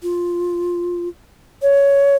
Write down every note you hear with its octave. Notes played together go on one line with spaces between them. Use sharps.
F4
C#5